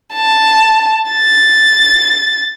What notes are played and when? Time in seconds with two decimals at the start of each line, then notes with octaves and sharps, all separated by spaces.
0.14 A5
1.12 A6